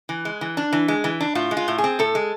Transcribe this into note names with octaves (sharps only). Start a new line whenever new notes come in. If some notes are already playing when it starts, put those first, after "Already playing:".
E3
G#3
E3
D4
E3
G#3
E3
D4
A2 F4
G#3
F4
A2
G#4
C4
A2 A4
G#3